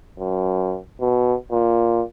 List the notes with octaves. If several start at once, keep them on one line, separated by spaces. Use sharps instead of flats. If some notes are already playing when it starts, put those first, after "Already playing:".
F#2
B2
A#2